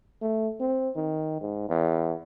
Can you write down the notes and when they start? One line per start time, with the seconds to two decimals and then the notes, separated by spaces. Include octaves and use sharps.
0.22 A3
0.60 C4
0.96 D#3
1.41 G#2
1.69 E2